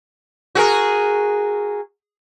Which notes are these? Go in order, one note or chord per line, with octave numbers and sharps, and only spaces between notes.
F#4 G#4 A#4